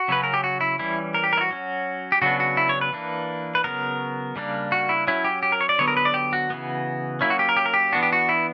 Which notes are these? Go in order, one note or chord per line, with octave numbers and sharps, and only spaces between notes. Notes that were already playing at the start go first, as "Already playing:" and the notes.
Already playing: F#4
C#3 F#3 C#4 B4
A#4
G4
F#4
E4
E3 G3 C#4 E4
A#4
G4
A#4
E4
F#4
F#3 C#4
G4
C#3 F#3 B3 D4 F#4
F#4
E4
C#5
B4
E3 A#3 D4
B4
C#3 F#3 B3 A#4
C#3 G3 A#3 D4
F#4
E4
F#3 C#4 E4
G4
G4
A#4
C#5
D5
D3 F#3 B3 C#5
A#4
B4
D5
G4
F#4
C#3 E3 B3
F#3 A#3 C#4 E4
F#4
G4
A#4
G4
A#4
G4
E3 B3 D4 F#4
G4
F#4
E4